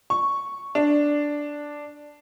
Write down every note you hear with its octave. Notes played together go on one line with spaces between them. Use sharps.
C#6
D4